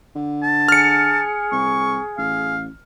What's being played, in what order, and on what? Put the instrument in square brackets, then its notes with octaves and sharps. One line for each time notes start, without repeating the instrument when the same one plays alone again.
[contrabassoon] D3
[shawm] A5
[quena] G#4 [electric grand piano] F6 C#7
[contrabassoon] C2 [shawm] C#6
[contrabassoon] A1 [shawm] F5